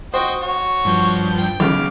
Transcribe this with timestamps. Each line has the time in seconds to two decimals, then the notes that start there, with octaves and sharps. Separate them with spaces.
0.14 F#4 C5 D#5 G5
0.42 F#4 C#5
0.85 G2 F3 G6
1.38 G5
1.60 B1 C#3 D6 F6